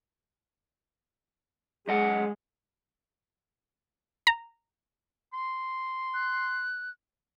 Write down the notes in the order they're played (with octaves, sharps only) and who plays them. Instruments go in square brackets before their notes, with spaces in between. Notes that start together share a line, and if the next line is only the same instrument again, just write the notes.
[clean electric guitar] F#2 D#5 F#5 [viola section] G#3
[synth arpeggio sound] A#5
[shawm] C6
[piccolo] F#6